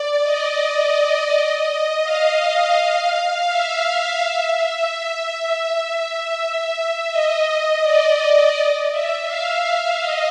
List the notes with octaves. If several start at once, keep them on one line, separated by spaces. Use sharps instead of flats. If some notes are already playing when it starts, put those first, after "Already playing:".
Already playing: D5
D#5
F5
F5
E5
E5
D#5
D5
E5
F5
E5
D#5